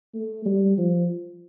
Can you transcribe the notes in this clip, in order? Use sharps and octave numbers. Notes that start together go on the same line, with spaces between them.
A3
G3
F3